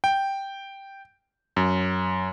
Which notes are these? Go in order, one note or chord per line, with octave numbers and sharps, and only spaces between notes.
G5
F#2